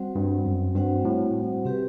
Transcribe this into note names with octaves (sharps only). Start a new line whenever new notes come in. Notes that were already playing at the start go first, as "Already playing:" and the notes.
Already playing: G3 C4 F#4 C5 F#5
G2
F#2
G2 G3 C4 F#4 C5 F#5
A2
C3 C4 G4 B4